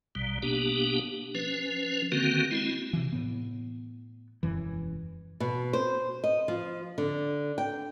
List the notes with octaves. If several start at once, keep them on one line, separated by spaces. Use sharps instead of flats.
A#1 B2 G3
B2 A#3 B3 D4 G4
F3 C#4 B4
D3 D#3 A#3 C4 F#4
G#3 C4 E4
C3 E3
A2 B3
E1 F#2 E3
B2
C5
D#5
F3
D3
G5